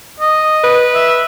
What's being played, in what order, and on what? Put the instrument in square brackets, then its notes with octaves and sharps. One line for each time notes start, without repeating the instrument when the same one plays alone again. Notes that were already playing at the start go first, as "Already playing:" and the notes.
[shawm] D#5
[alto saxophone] B4
[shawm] E5